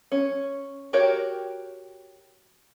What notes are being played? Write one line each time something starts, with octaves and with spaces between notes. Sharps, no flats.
C#4
F#4 G4 A#4 C#5 G5